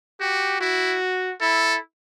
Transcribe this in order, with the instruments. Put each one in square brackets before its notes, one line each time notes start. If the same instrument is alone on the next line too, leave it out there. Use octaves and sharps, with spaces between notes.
[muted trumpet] F#4 [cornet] G4
[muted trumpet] E4 [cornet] F#4
[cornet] E4 [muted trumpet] A4